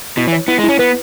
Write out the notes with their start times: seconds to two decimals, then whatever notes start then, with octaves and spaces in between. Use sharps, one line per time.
0.17 B2 E4
0.27 E3
0.33 C#5
0.48 B3 E4
0.58 G#3
0.64 C#4 E4
0.79 B3 B4